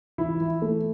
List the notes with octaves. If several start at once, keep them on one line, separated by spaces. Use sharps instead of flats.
E3 E4
E3
A3